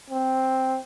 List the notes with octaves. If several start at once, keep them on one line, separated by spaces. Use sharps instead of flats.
C4